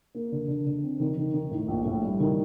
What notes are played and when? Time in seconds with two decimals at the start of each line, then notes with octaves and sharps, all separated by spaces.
0.15 A#3
0.32 D3
0.48 D3
0.66 D3
0.83 C4
1.00 D#3
1.17 D#3
1.34 D#3
1.51 A2
1.68 A#1
1.85 A2
2.02 G3
2.20 D#3